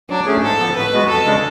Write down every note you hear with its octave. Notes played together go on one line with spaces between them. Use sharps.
F#3 D4
A3 C#4 G#4
G#2 A4
F3 B3
A2 B4
G#3 B3 F#4
F2 A4
C#3 G#3 D4